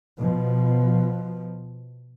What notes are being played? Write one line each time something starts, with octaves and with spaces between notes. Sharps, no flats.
B2 F3